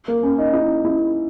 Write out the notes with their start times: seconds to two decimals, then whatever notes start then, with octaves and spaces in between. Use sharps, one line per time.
0.08 A#3
0.23 C#4
0.38 D#4
0.53 E4
0.85 E4